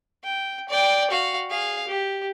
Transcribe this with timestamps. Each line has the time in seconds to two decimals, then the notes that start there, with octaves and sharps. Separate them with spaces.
0.24 G5
0.69 D5 G5
1.11 F#4 F5
1.50 G#4 F5
1.88 G4